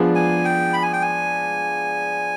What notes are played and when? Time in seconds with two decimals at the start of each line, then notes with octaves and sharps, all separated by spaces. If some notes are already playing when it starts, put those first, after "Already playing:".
Already playing: F3 B3 D4 G#4 D5
0.15 G#5
0.45 G5
0.73 B5
0.83 G#5
0.93 G5
1.02 G#5